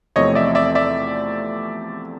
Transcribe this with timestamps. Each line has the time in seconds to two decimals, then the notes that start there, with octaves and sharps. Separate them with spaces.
0.16 E2 C3 F3 A3 C4 C#5 D#5
0.35 D5 E5
0.55 D5 E5
0.75 D5 E5